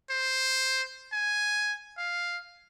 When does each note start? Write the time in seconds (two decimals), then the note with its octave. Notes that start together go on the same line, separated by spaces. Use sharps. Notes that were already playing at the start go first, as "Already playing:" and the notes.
0.10 C5
1.13 G#5
1.97 F5